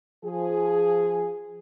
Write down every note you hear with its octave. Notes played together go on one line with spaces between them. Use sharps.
F3 G#4